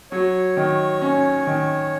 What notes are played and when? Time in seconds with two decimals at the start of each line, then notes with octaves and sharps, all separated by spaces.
0.12 F#3 C#5
0.57 D#3
1.01 C#4
1.47 D#3